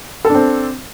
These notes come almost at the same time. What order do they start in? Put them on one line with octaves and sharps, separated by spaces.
A4 D4 C4